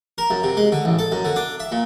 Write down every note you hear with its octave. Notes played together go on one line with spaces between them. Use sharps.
A#4
F#2
C3
G#3
D3
A1
A4
F#2
D3
D4
E5
A#2